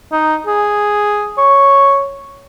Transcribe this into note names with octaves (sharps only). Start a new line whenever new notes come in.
D#4
G#4
C#5